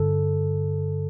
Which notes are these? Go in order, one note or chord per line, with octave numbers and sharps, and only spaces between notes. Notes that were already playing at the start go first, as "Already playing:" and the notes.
Already playing: G2 D3 A4